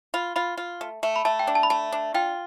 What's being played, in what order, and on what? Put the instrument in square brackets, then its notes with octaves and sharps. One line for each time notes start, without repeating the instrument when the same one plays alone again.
[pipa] F4 [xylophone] B5
[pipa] F4 [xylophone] B5
[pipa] F4
A3
A3
[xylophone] B5
[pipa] A3 [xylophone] A5
[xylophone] G5
[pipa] D4
[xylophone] A5
B5
[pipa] A3 [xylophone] A5
[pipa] D4
[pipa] F4 [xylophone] G5